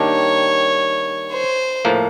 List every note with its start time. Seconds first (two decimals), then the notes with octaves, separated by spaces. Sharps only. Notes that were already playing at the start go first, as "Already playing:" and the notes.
Already playing: D#3 G3 A#3 D4 G4 C#5
1.33 C5
1.85 A2 F3 A#3